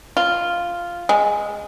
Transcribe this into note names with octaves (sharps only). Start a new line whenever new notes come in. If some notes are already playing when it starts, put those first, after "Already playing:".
F4
G#3